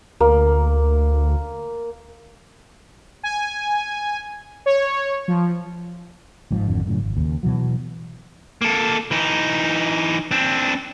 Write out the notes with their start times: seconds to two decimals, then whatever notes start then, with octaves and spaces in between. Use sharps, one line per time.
0.20 D2 A#3
3.23 G#5
4.66 C#5
5.28 F3
6.51 G1 G#2 F3
6.67 G#1 F2 D3
6.85 F#2 A2 C#3
6.98 G#1
7.17 D#2 C#3
7.43 B2 E3 F#3
8.62 A#3 A4
9.11 E3 D#4
10.31 C4 D4